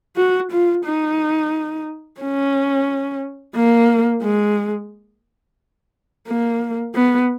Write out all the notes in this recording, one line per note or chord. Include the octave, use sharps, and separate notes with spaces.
F#4
F4
D#4
C#4
A#3
G#3
A#3
B3